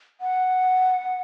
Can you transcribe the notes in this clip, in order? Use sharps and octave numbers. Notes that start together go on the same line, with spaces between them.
F#5